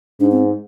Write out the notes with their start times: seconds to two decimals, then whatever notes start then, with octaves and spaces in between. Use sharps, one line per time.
0.20 G#2 D4
0.31 C4